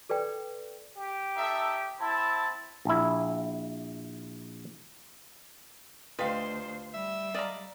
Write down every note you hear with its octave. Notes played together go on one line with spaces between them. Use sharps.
A4 B4 D5 G5
G4
D#4 A4 E5
C4 E4 A5
A#1 E4
D2 F4 G4 B4 C5 D#5 F5
G3 E5
D5 D#5 F5 A#5